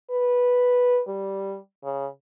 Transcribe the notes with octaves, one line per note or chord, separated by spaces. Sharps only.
B4
G3
C#3